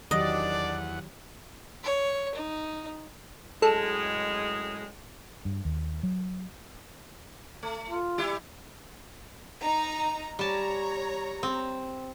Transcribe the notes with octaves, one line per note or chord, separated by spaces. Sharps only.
E2 D#3 F#3 D4 G4 D5 D#5 F#5
C#5
D#4
F#2 A2 G#3 A4
G2
D#2
F#3
A3
F4
G3 E4 G4
D#4 A#5
G3 C#5 A5 A#5
C4